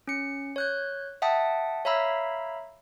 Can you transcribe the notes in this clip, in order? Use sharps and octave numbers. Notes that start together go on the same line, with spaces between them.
C#4 C#7
C#5 F#6 G6
E5 F#5 G5 A5 D#6
C#5 E5 F5 A#5 B5 E6